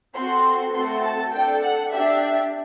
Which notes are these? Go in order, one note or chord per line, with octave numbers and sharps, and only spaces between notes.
C4 F#4 A4 C6
A3 C4 F#4 A4 C6
A5
D4 A4 G5
F#5
D4 G4 E5